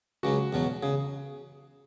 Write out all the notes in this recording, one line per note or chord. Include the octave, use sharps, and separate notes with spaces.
C#2 C#3 F#3 F#4
E2 B2 F#3
C#3 G#4